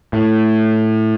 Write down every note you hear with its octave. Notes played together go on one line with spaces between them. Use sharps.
A2